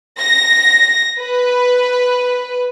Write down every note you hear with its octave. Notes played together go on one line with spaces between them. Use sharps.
A#6
B4